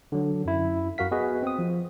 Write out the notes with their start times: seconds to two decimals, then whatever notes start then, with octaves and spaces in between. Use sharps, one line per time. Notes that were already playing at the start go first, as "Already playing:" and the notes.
0.12 D3 F#3
0.45 F#2 E4
0.98 F#2 F#4 A#4 F5 B6
1.11 B3 F#4 G#4 B4 D#5
1.43 C4 D#6
1.59 F3